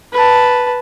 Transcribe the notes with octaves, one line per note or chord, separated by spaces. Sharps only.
B4 A5